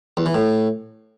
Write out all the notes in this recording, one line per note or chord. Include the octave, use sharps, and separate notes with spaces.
E2
E3
A2